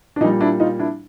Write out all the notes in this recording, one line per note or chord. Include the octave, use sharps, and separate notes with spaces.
D4
A#2 G3 D#4
D4 E4
D#4 F4
D4 E4